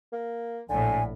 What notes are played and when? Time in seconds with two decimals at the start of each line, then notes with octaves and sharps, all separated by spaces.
0.12 A#3
0.69 A#1 A2 D3 G#5